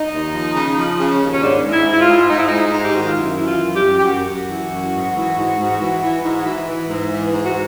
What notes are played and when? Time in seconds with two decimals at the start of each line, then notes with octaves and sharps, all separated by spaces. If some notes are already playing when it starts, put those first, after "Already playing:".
Already playing: D#4
0.11 D#2
0.33 F3
0.55 C#3
0.77 F3
0.98 C#3
1.21 D#2
1.32 C#4
1.42 G#2 D4
1.65 G#2
1.72 E4
1.86 G#2
1.93 E4
2.01 F4
2.08 G#2
2.30 G#2 D#4
2.38 E4
2.47 G#2 D#4
2.74 G#2
2.84 G4
2.95 D#3 F#4
3.06 F4
3.17 F#2 E4
3.37 E3 E4
3.46 F4
3.61 F#2
3.75 G4
3.83 F#2
3.98 G4
4.05 F#2 F#4
4.27 F#2
4.49 E3
4.70 F#2
4.92 G#2
5.15 E3
5.36 G#2
5.57 G#2
5.80 E3
6.02 E3
6.24 G#2
6.46 E3
6.67 E3
6.89 G#2
7.11 E3
7.33 G#2
7.45 F#4